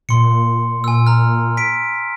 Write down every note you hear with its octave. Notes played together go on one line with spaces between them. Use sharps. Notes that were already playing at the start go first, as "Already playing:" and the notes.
A#2 C6 C#7
G#5 E6
A#5 F6
B6 D7